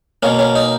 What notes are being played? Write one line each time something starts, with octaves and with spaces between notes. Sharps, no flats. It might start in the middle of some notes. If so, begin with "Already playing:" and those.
B2 A#3 C#4
C#4
D#4